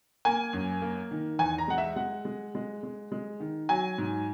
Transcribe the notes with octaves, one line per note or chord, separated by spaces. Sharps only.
A#3 G#5
F#2
A#3
D#3
E2 G#5
A#5
G#3 F#5
E5
G#3 F#5
G#3
G#3
G#3
G#3
D#3
F#3 G#5
G#2